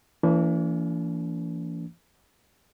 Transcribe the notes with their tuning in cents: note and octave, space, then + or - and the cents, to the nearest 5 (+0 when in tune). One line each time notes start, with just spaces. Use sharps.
E3 +25 A#3 -25 D4 -45